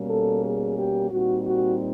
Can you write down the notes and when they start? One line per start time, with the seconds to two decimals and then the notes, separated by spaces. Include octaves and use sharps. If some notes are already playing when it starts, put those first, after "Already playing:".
Already playing: B2 G3 A#3 C#4
0.10 A4
0.44 G#4
0.77 G4
1.11 A#2 G3 C4 D#4 F#4
1.44 F#4